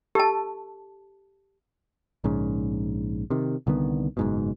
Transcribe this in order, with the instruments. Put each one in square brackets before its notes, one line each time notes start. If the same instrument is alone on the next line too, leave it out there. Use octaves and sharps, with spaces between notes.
[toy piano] G4 A5 [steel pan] A4
[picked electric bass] A#1 G#2 C#3
C3 D#3
C2 D3 D#3 B3
F#1 G#2 B2